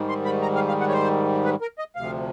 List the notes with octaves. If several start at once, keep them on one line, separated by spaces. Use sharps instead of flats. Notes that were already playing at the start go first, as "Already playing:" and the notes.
Already playing: G#2 D#3 G3
C6
B5
A#5
F5
F5
F#5
C#5
C5
B4
A#4
D#5
D2 C3 F3 F5